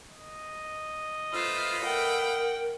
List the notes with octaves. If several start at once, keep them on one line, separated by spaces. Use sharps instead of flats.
D#5
A3 F4 B4 C5 F5
A#4 F#5 G5